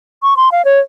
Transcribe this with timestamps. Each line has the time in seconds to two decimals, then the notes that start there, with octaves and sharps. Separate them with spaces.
0.23 C#6
0.37 C6
0.52 F5
0.65 C#5